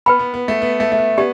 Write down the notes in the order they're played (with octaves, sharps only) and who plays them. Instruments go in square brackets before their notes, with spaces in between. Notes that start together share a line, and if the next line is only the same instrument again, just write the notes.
[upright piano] B3 [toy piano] B4 G5 B5
[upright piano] B3
B3
A3
B3
A3
A3
B3
[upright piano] B3 [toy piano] G4 D5